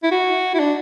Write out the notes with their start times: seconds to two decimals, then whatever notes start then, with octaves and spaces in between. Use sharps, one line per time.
0.03 E4
0.11 F#4
0.54 E4
0.59 D4